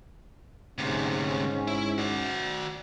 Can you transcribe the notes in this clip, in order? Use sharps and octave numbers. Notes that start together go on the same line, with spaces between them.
D2 G#2 C3 C#4
E4
F#4 D5